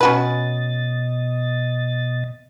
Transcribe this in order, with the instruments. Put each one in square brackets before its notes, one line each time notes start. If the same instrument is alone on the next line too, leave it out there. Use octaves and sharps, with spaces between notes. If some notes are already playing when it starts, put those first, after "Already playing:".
[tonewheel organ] B2 D#5 A6 [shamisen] C#4 F#4 B4